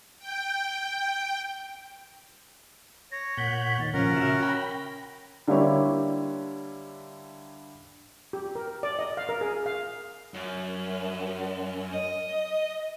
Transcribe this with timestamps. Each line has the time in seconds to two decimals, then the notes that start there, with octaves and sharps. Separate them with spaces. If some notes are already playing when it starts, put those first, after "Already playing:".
0.19 G5
3.12 C#5 A#6
3.37 A#2 F#5 G6 B6
3.80 D#3 A6
3.94 A#2 C#3 F3 C#4 A#4 F#5 A#6
4.16 F#4 E5
4.42 G5 B5
5.48 D3 G3 A#3 E4 G4 C#5
8.33 G4
8.55 A#4
8.83 D5
8.99 D#5
9.17 F5
9.29 A#4
9.41 G#4
9.66 F5
10.34 F#2
11.93 D#5